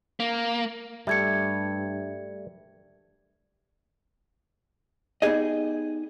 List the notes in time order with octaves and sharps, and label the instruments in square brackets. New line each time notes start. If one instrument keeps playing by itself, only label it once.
[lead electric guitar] A#3
[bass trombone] G2 [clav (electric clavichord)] G3 A3 [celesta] E5 G#6 C#7
[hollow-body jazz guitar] B3 D#4 G4 G#4 D#5